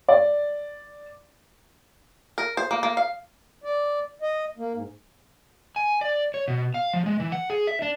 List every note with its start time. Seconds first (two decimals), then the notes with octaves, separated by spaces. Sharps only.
0.09 D5
2.38 A#4
2.57 C5
2.71 A#3
2.83 A#3
2.97 F5
3.64 D5
4.22 D#5
4.58 A#3
4.74 G#2
5.76 G#5
6.01 D5
6.34 C#5
6.48 B2
6.74 F5
6.94 F3
7.06 G#3
7.20 E3
7.32 F#5
7.50 G#4
7.67 E5
7.82 D4